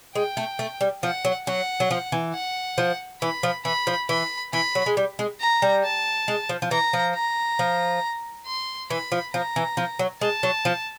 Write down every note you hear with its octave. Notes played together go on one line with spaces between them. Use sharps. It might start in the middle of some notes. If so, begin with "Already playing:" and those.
G#3 G5
A3
A3
G3
F3 F#5
F#3
F#3 F#5
F#3
F3
E3
F#5
F3
E3 B5
F3
E3 B5
F3
E3 B5
E3 B5
F#3
G#3
G3
G#3
A#5
G3
A5
G#3
F3
F3
E3 A#5
F3
A#5
F3
C6
E3 B5
F3
F3 A#5
E3
F3
F#3
G#3 A5
F#3
F3